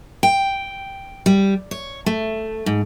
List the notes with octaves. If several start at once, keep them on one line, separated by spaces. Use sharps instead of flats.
G5
G3
C#5
A3
G#2